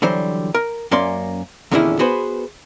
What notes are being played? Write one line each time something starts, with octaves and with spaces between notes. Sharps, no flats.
D3 E3 F#3 G3 C5
A#4
F#2 A#3 C#4 D5 C6
E2 A#2 D3 D#3 C#4 E4
B3 F#4 G#4 B4 C5